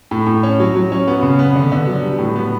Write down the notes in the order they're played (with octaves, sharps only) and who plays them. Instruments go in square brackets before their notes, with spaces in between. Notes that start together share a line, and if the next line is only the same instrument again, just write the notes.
[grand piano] A2
A2
C#4
F#3
F#3
C#4
B3
C#3
B3
D3
D3
F#3
G3
A2
B3